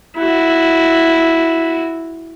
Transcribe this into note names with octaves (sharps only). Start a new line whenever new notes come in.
E4 F#4